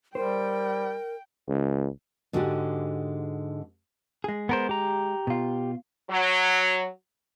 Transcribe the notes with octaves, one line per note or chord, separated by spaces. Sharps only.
G3 A#4 C5 G5
C#2
G#2 D3 G#3 F#4 G4
G#3 G#4
B3 A#4 C5
G4 A#5
B2 F4
F#3